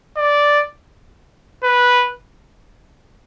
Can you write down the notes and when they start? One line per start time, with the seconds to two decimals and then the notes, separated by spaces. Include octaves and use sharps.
0.17 D5
1.64 B4